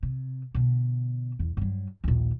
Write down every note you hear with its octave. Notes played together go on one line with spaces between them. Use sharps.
C3
B2 D3
E2
G2 F#3
A#1 D#2